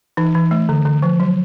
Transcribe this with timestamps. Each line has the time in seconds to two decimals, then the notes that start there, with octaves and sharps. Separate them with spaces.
0.17 E3 D#4
0.35 E3
0.51 A3
0.69 D3
0.85 D3
1.02 F3
1.20 F#3